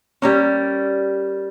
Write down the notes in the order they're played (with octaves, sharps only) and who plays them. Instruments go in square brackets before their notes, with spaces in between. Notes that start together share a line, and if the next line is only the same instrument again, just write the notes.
[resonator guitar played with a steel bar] G3 A#3 C#4